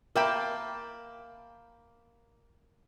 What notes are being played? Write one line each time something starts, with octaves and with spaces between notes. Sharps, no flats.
A#3 A#4 E5 G5 A5 B5